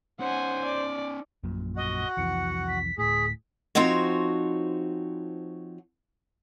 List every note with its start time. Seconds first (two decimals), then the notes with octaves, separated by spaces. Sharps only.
0.20 C#4 D#4 C5 F#5 G#5
0.66 D5
1.44 A#1 F#2 A#2
1.76 F#4 D#5 F#5
2.17 C2 F2 E3 C#7
2.67 B6
2.98 D1 A2 G#4 B6
3.75 F3 C4 D#4 F#4 C#5